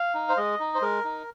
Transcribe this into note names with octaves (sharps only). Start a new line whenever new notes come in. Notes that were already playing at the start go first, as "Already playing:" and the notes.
Already playing: F5
D#4
C5
G#3 D#5
D#4
C5
G#3 A#4
D#4